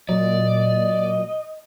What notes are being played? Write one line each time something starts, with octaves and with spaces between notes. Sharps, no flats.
A#2 F#3 D5 D#5